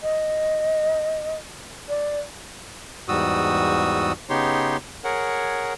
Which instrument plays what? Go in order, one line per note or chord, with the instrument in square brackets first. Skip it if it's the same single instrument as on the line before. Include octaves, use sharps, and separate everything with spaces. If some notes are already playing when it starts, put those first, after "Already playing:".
[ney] D#5
D5
[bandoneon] E2 G#2 G3 F#4 D#6 E6
C#3 B3 D#4 G4 C#5 C6
G#4 A#4 C#5 F#5